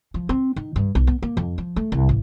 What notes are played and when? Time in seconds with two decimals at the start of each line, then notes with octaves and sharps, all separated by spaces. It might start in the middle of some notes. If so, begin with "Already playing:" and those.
0.14 F3
0.29 C4
0.56 D#3
0.76 G2
0.95 B1
1.07 B3
1.23 A#3
1.37 F2
1.58 F3
1.76 A3
1.92 C2
2.09 A1